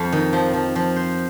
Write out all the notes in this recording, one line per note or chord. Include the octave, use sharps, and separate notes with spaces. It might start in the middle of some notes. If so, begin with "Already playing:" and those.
Already playing: F2
D#3
F3
F3
F3
C5